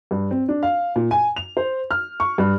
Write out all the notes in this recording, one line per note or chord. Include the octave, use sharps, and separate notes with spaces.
G2
C4
D4
F5
A#2
G#5
F7
C5
F6
C#6
G2